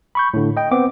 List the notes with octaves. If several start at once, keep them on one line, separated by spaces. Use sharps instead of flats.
B5 C#6 G6
A2 D3
D#5 G5
B3 C4 D6